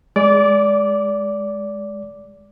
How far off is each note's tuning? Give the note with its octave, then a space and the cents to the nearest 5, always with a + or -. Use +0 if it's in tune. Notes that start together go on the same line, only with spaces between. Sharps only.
G#3 +0 D5 -25 D6 +0